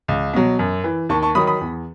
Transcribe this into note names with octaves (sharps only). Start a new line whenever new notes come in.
C#2
B2 F#3
F#2
E3
D#2 A5 C#6
A5 C#6
D#3 F#3 B5 D#6
B5 D#6
E2